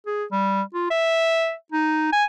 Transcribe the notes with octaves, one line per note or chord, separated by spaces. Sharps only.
G#4
G3
F4
E5
D#4
G#5